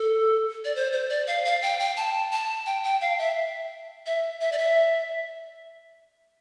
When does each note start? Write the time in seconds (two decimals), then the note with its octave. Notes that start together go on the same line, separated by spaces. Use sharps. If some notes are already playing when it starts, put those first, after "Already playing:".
Already playing: A4
0.65 D5
0.76 C5
0.93 C5
1.10 D5
1.27 F5
1.45 F5
1.62 G5
1.80 G5
1.97 A5
2.32 A5
2.66 G5
2.84 G5
3.01 F5
3.18 E5
4.06 E5
4.41 E5
4.52 D5
4.58 E5